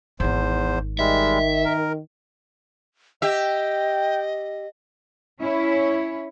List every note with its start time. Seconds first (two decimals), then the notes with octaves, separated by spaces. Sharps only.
0.20 D#1 G#1 E2 C5
0.99 D#3 G3 G#3 E5
1.65 A#4
3.22 G4 D#5 E5 G5
5.40 C#4 E4 C#5